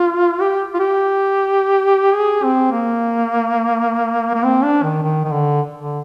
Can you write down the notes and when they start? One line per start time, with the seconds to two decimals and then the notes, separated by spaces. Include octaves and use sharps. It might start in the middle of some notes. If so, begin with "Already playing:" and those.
Already playing: F4
0.41 G4
0.74 F4
0.80 G4
2.14 G#4
2.43 C4
2.72 A#3
4.35 A#3
4.44 C4
4.64 D4
4.83 D#3
5.03 D#3
5.25 D#3
5.31 D3
5.79 D3